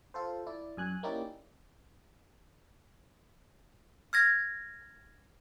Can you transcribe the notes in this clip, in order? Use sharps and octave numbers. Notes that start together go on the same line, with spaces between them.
F4 A4 C5
E4 D5
F#2 G#5 F#6
A#3 C#4 D#4 E4 G4 D5
F6 G#6 A#6